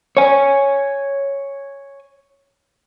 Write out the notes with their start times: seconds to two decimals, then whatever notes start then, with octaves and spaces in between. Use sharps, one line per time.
0.17 C#5 G#5